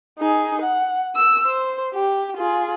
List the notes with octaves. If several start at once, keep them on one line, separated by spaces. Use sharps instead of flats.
D#4 G#4
F#5
E6
C5
G4
F4 G#4